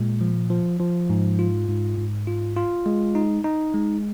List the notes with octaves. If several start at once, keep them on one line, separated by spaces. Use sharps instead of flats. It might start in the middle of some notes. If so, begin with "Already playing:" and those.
Already playing: A#2 G#3
F3
F3
F3
G#2
F4
G#2
G#2
F4
F4
G#3
D#4
D#4
G#3